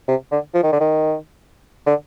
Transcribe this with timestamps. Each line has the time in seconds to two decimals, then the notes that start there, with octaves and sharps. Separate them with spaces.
0.08 C3
0.31 D3
0.54 F3
0.63 D#3
0.72 D3
0.80 D#3
1.87 D3